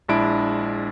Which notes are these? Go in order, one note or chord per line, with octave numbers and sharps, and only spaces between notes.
A#1 G#3 D4 E4 D7